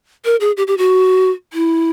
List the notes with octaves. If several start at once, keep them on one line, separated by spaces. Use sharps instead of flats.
A#4
G#4
G4
G4
F#4
E4